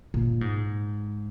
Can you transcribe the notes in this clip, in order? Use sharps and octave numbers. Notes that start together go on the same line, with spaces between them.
A#2
G#2